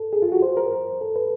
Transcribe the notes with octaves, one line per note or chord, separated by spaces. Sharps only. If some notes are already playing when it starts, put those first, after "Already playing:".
Already playing: A4
G#4
F4
F#4
C5
A#4
A4
B4